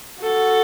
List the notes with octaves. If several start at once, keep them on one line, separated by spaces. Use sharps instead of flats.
F#4 A4